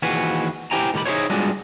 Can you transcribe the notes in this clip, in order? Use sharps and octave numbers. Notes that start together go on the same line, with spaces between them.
D#2 E3 F3 F#4 G#4 B4
E4 G4 C5 G5 G#5 A#5
A2 D#3 G4 B5
D#4 E4 F#4 G#4 C5 C#5
G3 G#3 B3 D4 F4 F#4